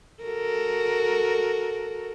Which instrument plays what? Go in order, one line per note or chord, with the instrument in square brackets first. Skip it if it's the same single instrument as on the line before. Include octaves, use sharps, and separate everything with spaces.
[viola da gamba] F#4 A4 A#4